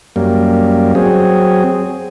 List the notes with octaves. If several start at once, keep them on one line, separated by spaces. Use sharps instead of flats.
F#2 G3 A#3
F#3 C4 G#4